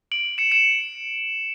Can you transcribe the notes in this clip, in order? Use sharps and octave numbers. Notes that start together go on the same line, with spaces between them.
D7 F#7
C#7 E7
C#7 E7